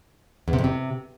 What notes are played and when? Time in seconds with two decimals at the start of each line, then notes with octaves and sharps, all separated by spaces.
0.48 E2
0.53 C3
0.59 F2
0.64 C3